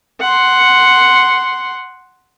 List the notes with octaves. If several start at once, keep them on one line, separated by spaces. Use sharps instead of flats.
F#5 C6